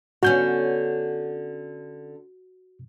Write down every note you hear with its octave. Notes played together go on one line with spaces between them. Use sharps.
D3 B3 C#4 F#4 G6